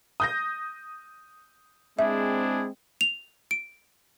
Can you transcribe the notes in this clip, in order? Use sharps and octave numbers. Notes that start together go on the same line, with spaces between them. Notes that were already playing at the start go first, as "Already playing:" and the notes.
D#6 G6 A#6
G#3 C4 D4 E4 G#4 E5
F7
D7